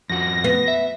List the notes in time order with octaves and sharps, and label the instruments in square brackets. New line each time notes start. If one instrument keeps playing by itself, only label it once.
[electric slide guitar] F2 F#4 [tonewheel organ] A#6
[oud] B3
[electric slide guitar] E5